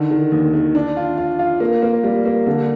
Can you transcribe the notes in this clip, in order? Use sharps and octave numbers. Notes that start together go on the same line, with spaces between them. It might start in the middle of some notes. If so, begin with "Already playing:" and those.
Already playing: D3 D#3
D#3
D#2
D#3
D4
F4
F4
F4
A#3
A#3
G3
A#3
D3